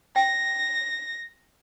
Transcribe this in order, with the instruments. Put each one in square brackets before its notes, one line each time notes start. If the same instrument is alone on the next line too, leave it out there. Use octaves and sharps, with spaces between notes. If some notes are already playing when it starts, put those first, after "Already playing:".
[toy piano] G5 [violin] A#6